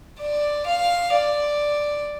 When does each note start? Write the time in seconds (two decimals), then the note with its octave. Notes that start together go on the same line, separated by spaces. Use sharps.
0.21 D5
0.67 F5
1.13 D5